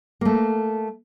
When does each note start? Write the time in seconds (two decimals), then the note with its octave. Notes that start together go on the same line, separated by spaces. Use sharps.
0.21 A3 A#3